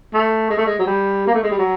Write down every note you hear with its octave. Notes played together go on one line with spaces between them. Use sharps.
A3
G#3
A3
G#3
F#3
G3
A#3
A3
G#3
G3
F#3